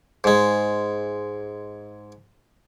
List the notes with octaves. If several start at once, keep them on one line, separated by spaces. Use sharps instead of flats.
G#2 G#3